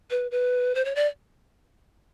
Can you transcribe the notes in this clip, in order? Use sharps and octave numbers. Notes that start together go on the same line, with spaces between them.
B4
B4
C5
C#5
D5